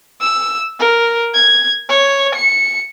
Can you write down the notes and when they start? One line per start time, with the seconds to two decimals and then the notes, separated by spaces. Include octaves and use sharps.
0.21 E6
0.79 A#4
1.34 G#6
1.89 C#5
2.35 C#7